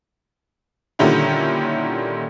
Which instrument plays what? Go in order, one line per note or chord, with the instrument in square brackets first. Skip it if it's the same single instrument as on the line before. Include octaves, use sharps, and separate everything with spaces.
[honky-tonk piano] A#2 D3 D#3 G3 C#4 E4